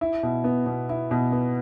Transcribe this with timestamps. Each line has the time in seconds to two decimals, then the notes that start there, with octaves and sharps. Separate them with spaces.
0.01 E4
0.23 B2
0.44 B3
0.66 B2
0.89 E4
1.11 B2
1.32 B3